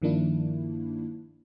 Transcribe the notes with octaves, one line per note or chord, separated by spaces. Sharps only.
G2 D#3 F3 A#3 D4 E4